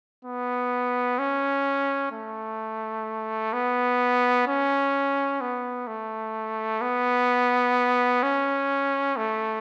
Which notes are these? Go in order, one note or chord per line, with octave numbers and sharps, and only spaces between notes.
B3
C#4
A3
B3
C#4
B3
A3
B3
C#4
A3